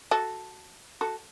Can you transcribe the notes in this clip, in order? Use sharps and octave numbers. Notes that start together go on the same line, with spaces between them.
F#4 A4
F#4 A4